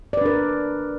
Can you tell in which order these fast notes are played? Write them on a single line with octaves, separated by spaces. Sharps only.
D5 B4 D4 A#4